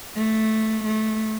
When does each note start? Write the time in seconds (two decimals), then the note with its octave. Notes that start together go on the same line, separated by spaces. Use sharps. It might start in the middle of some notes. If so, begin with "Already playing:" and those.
0.16 A3
0.84 A3